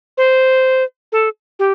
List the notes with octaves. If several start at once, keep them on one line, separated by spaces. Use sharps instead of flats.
C5
A4
G4